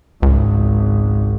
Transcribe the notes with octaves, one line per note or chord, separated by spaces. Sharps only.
G#1 C#2